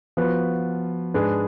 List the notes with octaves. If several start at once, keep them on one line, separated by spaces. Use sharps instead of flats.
F3 B3 F#4 B4
G#2 G#3 D4 G#4 B4